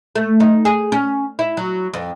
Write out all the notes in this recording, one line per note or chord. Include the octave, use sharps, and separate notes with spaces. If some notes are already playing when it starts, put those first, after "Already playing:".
A3
D#4
G#4
C#4
E4
F#3
F2